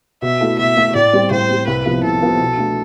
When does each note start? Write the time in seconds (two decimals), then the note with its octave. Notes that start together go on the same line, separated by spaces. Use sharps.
0.22 B2 E5
0.41 A3 E4 A4
0.59 B2 E5
0.77 A3 E4 A4
0.95 A2 D5
1.13 G3 C4
1.31 A2 C5
1.49 G3 C4
1.67 C2 B4
1.86 C3 F3 B3 E4
2.03 C2 A4
2.22 C3 F3 B3 E4
2.40 B2
2.57 A3 D4